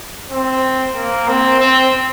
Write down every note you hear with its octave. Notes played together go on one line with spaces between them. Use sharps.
C4
A#3
C4
C4